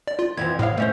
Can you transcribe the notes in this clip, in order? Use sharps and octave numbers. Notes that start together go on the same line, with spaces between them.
D5
F4
F2 E3 F3 G#6
D#2 A2 F5
A3 C#4 C5